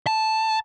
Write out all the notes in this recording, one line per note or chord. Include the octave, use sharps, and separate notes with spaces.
A5